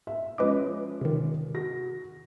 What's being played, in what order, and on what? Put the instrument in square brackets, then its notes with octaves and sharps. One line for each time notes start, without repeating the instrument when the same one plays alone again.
[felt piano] E5
[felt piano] F3 G#3 C#4 [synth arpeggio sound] B4 D#5 D6
[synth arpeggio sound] C3 D#3
[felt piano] F#4 A#6